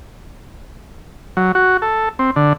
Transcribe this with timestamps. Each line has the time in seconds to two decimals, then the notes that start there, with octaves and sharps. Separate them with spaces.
1.37 F#3
1.55 F#4
1.82 A4
2.19 C4
2.36 D3